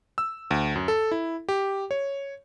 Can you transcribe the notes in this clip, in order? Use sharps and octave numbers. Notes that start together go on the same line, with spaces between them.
E6
D2
F#2
A4
E4
G4
C#5